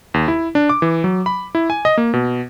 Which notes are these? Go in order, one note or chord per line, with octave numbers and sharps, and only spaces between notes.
D#2
E4
D4
D6
E3
F#3
B5
E4
G#5
D#5
A#3
B2